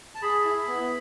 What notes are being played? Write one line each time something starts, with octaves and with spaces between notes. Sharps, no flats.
A5
G#4 B5
E4
B3